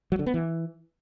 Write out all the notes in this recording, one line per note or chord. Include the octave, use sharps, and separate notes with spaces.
F#3
D3
B3
E3